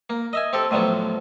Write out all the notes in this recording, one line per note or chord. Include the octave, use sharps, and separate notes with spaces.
A#3
D#5 E5 G#5
C4 G4 A4
A2 D3 F3 F#3 B3